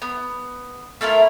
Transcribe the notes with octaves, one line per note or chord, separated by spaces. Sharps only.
B3
A3 E4 F4 A#4